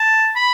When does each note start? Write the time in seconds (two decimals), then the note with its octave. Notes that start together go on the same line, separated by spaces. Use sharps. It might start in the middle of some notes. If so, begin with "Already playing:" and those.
Already playing: A5
0.36 B5